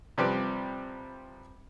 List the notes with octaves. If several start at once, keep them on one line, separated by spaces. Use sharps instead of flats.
C3 F3 G3 C4 G4 B4